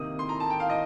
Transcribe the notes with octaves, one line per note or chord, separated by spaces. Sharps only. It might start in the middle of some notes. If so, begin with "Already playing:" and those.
Already playing: C3 D#3 A#3 D#6
C6
A#5
A5
G5
F5
D#5